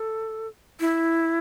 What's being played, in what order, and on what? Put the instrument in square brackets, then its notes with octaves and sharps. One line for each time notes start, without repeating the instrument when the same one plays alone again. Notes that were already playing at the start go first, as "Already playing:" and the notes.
Already playing: [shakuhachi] A4
E4